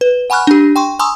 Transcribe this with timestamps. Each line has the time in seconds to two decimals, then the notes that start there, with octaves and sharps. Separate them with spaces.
0.01 B4
0.30 F#5 G#5 B5 C#6 F6 F#6
0.47 D4 G4
0.76 G5 C6 C#6
0.99 G#5 A#5 C6 C#6 D#6 E6